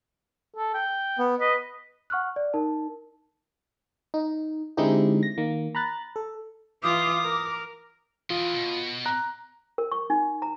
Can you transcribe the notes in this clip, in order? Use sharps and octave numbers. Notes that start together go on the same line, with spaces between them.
A4
G5
B3
B4 D#5
F#5 C#6 F6 F#6
D5
D#4 A#4 A5
D#4
D3 G#3 C4 D#4 E4 G4
A#6
D#3 A#3
A#5 B5 F#6 A6
A4
E3 F4 D6 D#6
A#4
E3 F4 D#5
B2
A#5 F#6
A#4
C#6
D#4
A#5